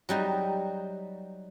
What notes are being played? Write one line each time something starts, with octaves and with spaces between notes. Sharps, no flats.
F#3 G3 D#4